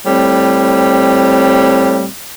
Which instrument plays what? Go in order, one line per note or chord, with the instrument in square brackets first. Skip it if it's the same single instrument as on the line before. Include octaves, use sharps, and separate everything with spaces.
[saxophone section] A2 G3 C4